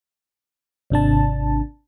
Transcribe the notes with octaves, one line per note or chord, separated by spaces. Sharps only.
G#1 C3 D4 A5